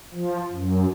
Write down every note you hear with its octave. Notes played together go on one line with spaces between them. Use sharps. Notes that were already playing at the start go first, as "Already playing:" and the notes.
F3
F#2